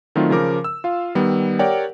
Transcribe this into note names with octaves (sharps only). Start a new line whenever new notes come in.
D#3 F#3 A3 C4 D#4 F4
C#3 F3 A#4 D6
E6
F4 F5
D#3 G3 B3
G4 A#4 C#5 D5 F#5 G5